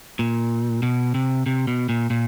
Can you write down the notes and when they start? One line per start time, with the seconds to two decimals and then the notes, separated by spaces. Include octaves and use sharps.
0.19 A#2
0.83 B2
1.14 C3
1.46 C3
1.67 B2
1.89 A#2
2.10 A#2